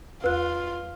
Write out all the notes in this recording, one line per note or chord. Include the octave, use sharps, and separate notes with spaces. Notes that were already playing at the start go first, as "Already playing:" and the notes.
E2 F4 B4 F#6